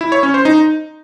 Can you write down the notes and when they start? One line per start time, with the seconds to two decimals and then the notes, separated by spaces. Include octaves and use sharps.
0.01 E4
0.12 C#5
0.23 C#4
0.34 C5
0.45 D#4